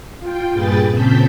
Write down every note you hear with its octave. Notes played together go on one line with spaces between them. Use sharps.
F4 G5
G2 A#2 G#4 B4 G5 A6
A#2 C#3 C4 A5 G6 B6